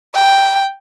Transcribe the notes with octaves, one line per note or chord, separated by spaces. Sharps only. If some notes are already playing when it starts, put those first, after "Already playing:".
G5